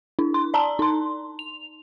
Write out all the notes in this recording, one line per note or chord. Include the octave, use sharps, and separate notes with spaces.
D4 E4
C6
D5 A5 A#5
D#4 C6
F7